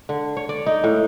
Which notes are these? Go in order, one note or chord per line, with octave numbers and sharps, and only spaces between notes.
D3
C#5
D5
D#4
A2